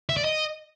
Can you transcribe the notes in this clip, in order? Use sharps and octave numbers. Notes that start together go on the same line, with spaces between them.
E5
D5
D#5